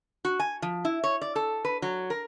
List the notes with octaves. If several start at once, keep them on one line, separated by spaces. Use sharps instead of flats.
F#4
G#5
F3
E4
C#5
D5
A4
B4
F#3
A#4